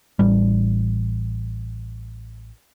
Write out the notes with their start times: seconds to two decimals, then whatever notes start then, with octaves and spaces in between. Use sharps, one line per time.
0.19 A1 G3